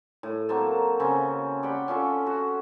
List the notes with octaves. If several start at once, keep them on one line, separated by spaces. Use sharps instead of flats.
A2
F#3 A#3 C4 A5
C#3 C4 C#4
D5 F#5 G5 B5
C#4 F4 A4 E5
F#4